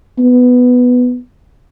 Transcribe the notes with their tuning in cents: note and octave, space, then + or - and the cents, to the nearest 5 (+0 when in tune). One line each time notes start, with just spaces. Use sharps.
B3 +5